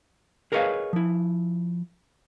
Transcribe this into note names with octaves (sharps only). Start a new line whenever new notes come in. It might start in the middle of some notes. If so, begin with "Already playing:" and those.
G#4 A#4 B4 C#5 D#5 F5
F3 E4